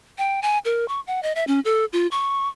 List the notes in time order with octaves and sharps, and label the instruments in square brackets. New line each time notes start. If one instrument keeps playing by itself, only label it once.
[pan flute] G5
G#5
A#4
C#6
F#5
D#5
E5
C#4
A4
F4
C#6